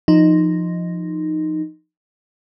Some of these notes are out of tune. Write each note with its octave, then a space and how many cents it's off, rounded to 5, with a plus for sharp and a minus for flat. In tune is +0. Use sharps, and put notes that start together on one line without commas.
F3 +0 D#4 -5